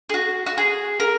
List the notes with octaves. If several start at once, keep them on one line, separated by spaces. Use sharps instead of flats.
G#4
F#4
F#4
G#4
A#4